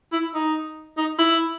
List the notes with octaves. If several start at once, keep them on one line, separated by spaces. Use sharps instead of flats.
E4
D#4
D#4
E4